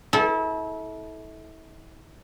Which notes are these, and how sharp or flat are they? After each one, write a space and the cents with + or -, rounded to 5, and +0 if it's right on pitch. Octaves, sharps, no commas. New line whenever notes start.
E4 -35 A4 -20